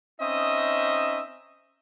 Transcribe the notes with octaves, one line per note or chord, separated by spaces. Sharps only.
C4 C#4 D#4 D#5 E5 D#6